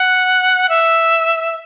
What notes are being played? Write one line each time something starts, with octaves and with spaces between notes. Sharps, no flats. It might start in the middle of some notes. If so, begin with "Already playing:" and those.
Already playing: F#5
E5